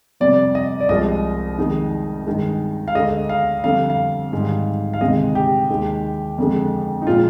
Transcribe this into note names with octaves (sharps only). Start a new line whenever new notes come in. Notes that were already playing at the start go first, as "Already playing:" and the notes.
F2 C3 G3 D5
D#5
D5
C2 C3 F3 G#3 D#5
F2 D#3 G#3
G2 D#3 G#3
F5
D2 D3 G#3 D#5
F5
F2 D3 G3 F5
F5
G#2 D#3 G3
F5
D2 C3 D#3 G#3 D#5
G4
D#2 D#3 G#3
F2 D3 G#3
D#4
A#2 F3 G#3 F4